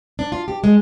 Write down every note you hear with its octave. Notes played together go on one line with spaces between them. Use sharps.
D4
F4
G4
G#3